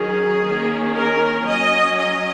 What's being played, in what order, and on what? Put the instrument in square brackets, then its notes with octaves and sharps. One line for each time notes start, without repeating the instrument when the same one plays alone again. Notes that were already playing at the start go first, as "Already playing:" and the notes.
Already playing: [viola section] D#3 F#3 C#4 G#4
D#3 A#3 C#4
A#4
F#3 C#4 D#5
D#5